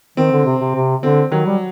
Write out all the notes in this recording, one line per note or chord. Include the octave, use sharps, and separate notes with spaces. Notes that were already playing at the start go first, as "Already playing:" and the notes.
D#3 C4
D3
C3
C3
C3
D3 C4
D#3 F#3
G3